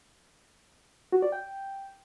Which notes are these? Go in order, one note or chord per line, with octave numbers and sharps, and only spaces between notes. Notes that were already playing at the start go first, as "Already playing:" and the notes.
F#4
D5
G5